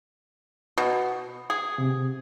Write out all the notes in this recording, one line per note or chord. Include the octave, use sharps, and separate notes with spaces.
B2
G#4
C3